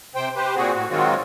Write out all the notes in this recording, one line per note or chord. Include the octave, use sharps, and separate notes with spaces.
C3 C5 G5
G4 B4 C5
A#2 C4 F#4 G#4
A2 F#4
D#3 F#3 G#3 C4 F4 F#4